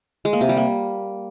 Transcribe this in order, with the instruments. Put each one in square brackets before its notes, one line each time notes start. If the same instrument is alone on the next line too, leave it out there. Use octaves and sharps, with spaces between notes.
[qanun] G#3
A#3
C3
G3
A#3